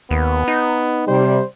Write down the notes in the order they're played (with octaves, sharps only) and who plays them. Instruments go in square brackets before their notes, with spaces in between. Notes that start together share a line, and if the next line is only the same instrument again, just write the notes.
[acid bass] D#2 [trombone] B3
[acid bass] D#4
[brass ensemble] C3 G3 [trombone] C5